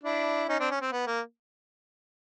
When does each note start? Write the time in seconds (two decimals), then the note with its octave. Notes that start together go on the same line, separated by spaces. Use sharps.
0.04 D4 E4
0.48 C#4 D#4
0.59 C4 D4
0.71 C#4
0.81 C4
0.92 B3
1.07 A#3